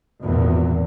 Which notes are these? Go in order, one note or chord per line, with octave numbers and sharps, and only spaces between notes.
G#1 E2 A#2